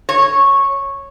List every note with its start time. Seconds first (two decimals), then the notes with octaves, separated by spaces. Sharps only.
0.09 C#5